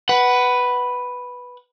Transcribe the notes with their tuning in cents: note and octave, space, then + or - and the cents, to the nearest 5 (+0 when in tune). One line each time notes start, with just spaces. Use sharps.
B4 +0 F#5 +20